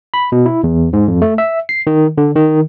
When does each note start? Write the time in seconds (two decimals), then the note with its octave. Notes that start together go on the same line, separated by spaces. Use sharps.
0.14 B5
0.32 B2
0.46 E4
0.64 E2
0.93 G#2
1.08 F2
1.22 A3
1.38 E5
1.69 C7
1.87 D#3
2.18 D3
2.36 D#3